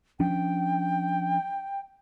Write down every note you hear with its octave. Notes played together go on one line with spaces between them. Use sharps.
F3 C#4 D4 G5